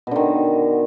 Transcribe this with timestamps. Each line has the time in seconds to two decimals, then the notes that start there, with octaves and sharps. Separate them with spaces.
0.07 B2
0.11 D3
0.16 D#3